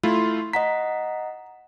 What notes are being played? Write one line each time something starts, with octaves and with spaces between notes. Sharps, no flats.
A3 E4 F4 C6
D#5 F#5 A#5 B6